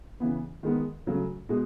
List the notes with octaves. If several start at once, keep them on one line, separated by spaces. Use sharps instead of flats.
C#3 E3 B3
D#3 G#3 B3
C#3 F#3 A3
B2 G#3